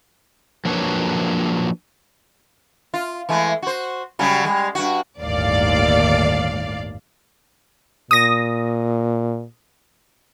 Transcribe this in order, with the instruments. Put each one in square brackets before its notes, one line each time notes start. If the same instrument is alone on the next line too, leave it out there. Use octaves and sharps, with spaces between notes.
[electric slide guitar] F3 F#3 A#3 D4 B4 C#5
[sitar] F4
E3 G#3 A3
F#4 C5
C#3 F#3 G3
G3 G#3
G2 F#4
[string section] G1 D#2 A2 D5 F5
[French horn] A#2 [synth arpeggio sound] D#6 A#6